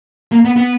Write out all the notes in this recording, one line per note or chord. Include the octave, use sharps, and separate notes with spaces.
A#3
B3
B3